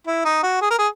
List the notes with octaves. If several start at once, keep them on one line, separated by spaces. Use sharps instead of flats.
E4
D#4
F#4
G#4
A#4
G#4